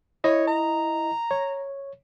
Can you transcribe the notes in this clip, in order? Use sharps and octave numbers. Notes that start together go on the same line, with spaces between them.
E4 C#5 D#5
A#5
C#5